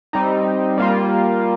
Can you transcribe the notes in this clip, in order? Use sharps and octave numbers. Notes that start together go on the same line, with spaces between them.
G3 C4 D#4
G3 A#3 F4